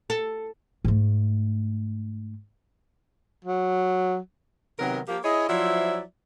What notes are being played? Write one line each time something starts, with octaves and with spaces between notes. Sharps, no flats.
A4
G#2 A3
F#3
C3 D#3 F#3 B3 A#4
F3 A#3 G4
E4 G#4 C#5 D#5
F3 F#3 E4 C5 D5 E5